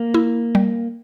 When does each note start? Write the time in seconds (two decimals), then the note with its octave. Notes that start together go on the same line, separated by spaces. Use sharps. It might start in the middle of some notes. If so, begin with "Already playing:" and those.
Already playing: A#3
0.14 E4
0.55 G3